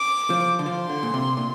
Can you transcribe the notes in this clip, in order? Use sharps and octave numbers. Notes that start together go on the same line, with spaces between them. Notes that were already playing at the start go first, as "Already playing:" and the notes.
Already playing: D6
F3
D3
F3 C6
D3
A#2
C3
A#2